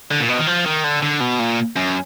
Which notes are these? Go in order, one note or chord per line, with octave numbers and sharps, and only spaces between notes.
D3
A#2
B2
D#3
F3
D#3
D3
D3
B2
A#2
F#2